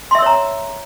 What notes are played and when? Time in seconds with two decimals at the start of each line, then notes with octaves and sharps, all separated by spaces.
0.11 C6
0.15 E5
0.19 E6
0.22 C#5
0.26 A#5